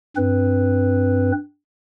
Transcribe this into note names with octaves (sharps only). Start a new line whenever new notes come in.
G2 C4 B4